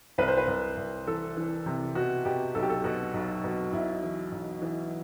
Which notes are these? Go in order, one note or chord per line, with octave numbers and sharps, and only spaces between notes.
C2 B4
C5
B4
C2
C2
E3 A4
E3
C3
B2 F#4
B2 G4
B1 A4
G4
A4
B2 F#4
B1
B2
B1 E4
E3
B1
E3